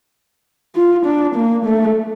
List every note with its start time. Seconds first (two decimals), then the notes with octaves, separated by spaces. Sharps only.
0.76 F4
1.06 D4
1.35 A#3
1.66 A3